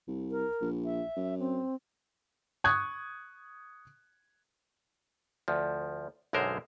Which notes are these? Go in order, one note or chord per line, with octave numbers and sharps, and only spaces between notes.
C2
A#4
A#1
E5
F#2
C4
C#6 D#6 F#6 G#6
D2 F3
B1 F#2 D3 G#3 A#4 C5